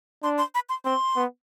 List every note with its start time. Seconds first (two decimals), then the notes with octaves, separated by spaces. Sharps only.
0.23 D4 C6
0.38 C6
0.55 B5
0.69 C6
0.85 C4 C6
1.16 B3